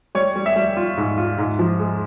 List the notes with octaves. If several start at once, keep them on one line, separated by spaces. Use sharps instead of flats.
G3 C#5
G3
E5
G3
F4
G#2
F4
G#2
F3
G#3